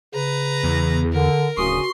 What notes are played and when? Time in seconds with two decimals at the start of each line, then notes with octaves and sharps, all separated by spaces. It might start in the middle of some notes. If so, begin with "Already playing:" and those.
0.14 C#3 B4 A#5
0.63 E2
1.13 D3 A#4
1.57 D1 C#3 C#4 F#4 C6 D#6